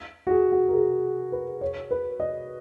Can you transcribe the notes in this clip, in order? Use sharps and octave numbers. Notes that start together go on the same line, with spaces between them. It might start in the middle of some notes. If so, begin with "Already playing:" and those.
F#4
G#4
F#4
A#4
G#4
B4
C#5
B4
D#5